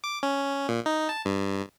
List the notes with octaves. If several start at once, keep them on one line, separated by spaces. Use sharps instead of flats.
D6
C#4
A#2
D#4
A5
G2